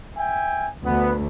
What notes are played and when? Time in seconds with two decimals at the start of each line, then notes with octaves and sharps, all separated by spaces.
0.18 E5 G5 G#5
0.85 D2 B3